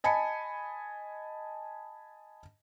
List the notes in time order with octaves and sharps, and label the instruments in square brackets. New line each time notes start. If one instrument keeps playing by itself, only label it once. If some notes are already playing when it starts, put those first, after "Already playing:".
[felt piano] D#5 G#5 A5 B5 C#7